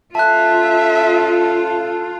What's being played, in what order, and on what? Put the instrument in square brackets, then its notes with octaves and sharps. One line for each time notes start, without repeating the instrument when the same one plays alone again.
[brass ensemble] C#4 E4 A4 [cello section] F4 [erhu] E5 [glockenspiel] A5 F#6